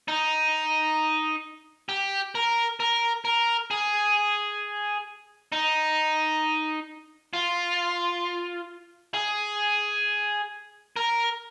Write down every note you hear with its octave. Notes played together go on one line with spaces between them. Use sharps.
D#4
G4
A#4
A#4
A#4
G#4
D#4
F4
G#4
A#4